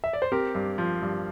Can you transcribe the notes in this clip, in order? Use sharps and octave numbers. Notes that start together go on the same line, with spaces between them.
E5
D5
C5
C4 G4 A#4
G2
F3
G2